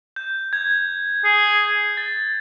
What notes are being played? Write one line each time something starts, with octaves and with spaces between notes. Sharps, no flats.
G6
G#6
G#4
A6